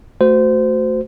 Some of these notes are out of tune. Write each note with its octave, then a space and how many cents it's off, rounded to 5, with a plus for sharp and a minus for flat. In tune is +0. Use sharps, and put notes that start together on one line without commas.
A3 +0 F#4 +0 C5 -25